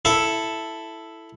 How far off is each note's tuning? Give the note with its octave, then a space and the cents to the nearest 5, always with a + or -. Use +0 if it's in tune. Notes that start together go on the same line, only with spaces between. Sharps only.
E4 +5 A4 +0